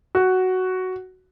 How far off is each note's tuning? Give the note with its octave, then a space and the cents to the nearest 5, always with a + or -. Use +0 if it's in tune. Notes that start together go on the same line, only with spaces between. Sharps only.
F#4 +5